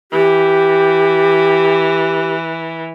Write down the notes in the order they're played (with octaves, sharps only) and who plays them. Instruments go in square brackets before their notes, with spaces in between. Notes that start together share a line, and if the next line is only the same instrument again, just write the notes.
[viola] E3 [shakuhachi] G4